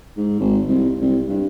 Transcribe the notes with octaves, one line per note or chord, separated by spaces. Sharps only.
G#2
G#1
C2
C2
G2